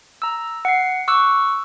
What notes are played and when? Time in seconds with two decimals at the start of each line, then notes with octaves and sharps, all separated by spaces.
0.22 A#5 E6
0.65 F#5 C7
1.08 C#6 D6 E6 F#6